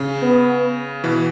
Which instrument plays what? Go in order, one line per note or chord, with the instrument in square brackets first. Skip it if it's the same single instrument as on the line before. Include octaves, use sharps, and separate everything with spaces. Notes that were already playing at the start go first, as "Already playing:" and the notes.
Already playing: [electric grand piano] C#3
[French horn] B3
[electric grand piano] B2 E3